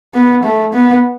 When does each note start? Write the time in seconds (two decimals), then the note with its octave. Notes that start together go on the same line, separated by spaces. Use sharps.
0.14 B3
0.43 A3
0.73 B3